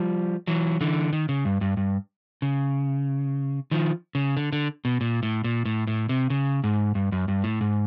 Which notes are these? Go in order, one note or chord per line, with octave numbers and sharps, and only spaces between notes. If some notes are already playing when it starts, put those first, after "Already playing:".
Already playing: F3 G3
E3 F#3
D3 E3
D#3
C#3
G2
G2
G2
C#3
D#3 F3
C#3
D3
D3
B2
A#2
A2
A#2
A2
A2
C3
C#3
G#2
G2
F#2
G2
A2
G#2